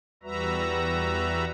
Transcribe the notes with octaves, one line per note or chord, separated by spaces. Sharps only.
E2 G3 F#4 B4 E5 A#5